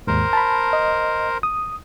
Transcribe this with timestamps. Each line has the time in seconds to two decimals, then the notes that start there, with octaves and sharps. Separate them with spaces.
0.07 D#2 G#2 A#4 C5
0.33 A5 B5
0.73 D#5
1.43 D#6